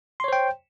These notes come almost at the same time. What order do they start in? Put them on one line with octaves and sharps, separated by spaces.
C6 C#5 C5 G5